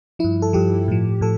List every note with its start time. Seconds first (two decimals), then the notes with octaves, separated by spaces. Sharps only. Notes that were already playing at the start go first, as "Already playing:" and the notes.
0.19 G2 F3 E4
0.42 A4
0.53 G2 F3 G4
0.88 A2 F3
1.21 A2 F3 A4